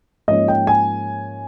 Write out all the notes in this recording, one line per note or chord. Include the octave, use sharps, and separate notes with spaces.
G#2 F3 A#3 C#4 D#5
G5
G#5